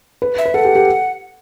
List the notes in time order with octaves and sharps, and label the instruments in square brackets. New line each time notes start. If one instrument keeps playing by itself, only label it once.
[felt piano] B4
[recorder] E5
[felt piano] B4
[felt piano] A4 [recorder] F#5
[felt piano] G4
G4